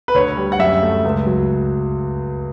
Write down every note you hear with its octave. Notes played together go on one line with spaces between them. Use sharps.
B4
D2 C#5
G3
F#5
F#2 E5
A3
C#2
F#3